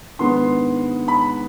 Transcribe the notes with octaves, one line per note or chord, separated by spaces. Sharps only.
G#2 D#3 G#3 B3 D4 C6
B5